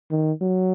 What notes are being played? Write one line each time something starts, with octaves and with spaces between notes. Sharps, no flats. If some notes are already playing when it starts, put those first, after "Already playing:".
D#3
F#3